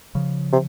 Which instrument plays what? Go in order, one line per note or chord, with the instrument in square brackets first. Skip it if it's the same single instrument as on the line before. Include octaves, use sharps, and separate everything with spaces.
[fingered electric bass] C#3 F3
[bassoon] C3